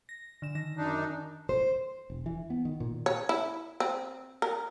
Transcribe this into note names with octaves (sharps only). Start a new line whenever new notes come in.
A#6
D3 E7
D#3 A#6
F#2 D4 D#4
C5
E1
E3
B3
D#3
A#2
C#5
E4
C4
A#4